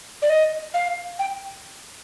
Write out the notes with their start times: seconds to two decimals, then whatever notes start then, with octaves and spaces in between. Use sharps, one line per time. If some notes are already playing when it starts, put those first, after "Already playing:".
0.22 D5
0.29 D#5
0.74 F5
1.19 G5